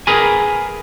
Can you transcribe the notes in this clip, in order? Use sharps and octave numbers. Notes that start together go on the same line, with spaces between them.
G#4 A#4 B4 G#5